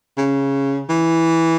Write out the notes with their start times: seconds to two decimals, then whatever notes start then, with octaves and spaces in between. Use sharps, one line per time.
0.18 C#3
0.90 E3